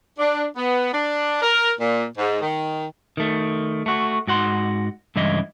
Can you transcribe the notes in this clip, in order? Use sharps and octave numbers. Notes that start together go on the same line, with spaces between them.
D4
B3
D4
A#4
A#2
G#2
D#3
D#3 A3
A3 F#4
G#2 F#4 F#5 C6
C#2 G2 E3 E4 D#5